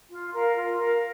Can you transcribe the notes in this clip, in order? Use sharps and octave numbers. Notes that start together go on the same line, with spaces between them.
F4
A#4 F5
F4
A#4 F5